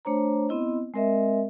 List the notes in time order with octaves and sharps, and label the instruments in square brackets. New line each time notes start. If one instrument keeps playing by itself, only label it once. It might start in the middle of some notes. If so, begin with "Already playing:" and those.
[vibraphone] A3 D4 C5 C#5 A#5
B3 C4 E4 D#5
G#3 C4 A#4 D#5 E5